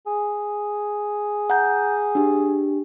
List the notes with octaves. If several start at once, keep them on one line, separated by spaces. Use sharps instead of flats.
G#4
F#5 A#5 G6
D4 G4